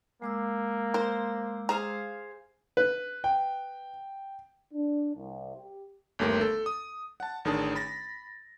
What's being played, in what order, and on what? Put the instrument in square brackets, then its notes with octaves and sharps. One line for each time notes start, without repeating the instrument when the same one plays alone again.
[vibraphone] G#3 D6 E6 [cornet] A#3
[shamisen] A#4 [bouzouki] C5
[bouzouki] G#4 C5 F5 [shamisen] A#5
[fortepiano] B4
[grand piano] G5
[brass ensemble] D4
C2
G4
[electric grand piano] G1 D#2 A3 G4 A#4
A4
D#6
F#5 A5
A1 D#3 D4 G#4 A5
B5 A6 A#6